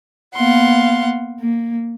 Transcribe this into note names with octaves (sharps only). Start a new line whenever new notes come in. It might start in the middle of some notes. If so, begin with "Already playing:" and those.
A#3 B3 F5 F#5 C6
A#3